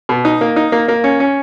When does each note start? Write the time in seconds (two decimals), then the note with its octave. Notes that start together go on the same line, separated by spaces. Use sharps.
0.09 B2
0.25 D#4
0.41 A#3
0.56 D#4
0.72 A#3
0.88 A#3
1.04 C#4
1.20 C#4